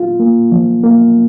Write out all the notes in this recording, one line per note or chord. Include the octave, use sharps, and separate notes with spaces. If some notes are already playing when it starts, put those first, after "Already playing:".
Already playing: F4
A#3
F3
A#3